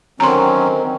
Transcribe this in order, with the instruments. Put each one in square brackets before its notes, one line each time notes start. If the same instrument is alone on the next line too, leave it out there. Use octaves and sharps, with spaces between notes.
[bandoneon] D3 F#3 C#4 [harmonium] D#3 C4 [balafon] A#5 C6